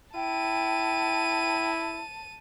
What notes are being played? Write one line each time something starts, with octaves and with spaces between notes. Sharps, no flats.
E4 G5 A5 D#7